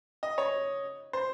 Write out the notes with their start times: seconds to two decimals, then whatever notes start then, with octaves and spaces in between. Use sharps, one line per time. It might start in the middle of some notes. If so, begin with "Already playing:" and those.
0.23 D#5
0.38 C#5
1.13 C5